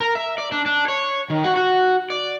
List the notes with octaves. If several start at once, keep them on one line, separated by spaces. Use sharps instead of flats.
A#4
E5
D5
D4
D4
C#5
D#3
F#4
F#4
D5